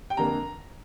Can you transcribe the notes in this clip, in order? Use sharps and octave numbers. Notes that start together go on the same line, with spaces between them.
G5
F2 D3 A#3 A#5